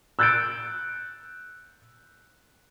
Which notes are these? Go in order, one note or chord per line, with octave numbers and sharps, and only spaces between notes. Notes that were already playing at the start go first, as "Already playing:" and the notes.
E6 F#6 G6 A6 C#7 D7